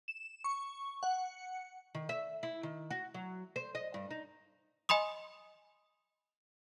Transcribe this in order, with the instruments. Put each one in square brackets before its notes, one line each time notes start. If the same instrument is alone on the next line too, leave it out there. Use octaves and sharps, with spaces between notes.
[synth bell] E7
C#6
F#5
[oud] D#3
E5
E4
D#3
F#4
F#3
C5
D#5
G2
D#4
[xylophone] D#5 G#5 B5 C6 D#6